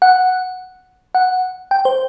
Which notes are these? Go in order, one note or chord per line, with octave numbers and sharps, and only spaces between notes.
F#5
F#5
G5
C5